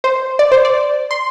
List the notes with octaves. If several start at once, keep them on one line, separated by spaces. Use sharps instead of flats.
C5
D5
C5
D5
C6